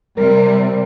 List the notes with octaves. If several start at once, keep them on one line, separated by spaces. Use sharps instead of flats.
C3 G3 A#4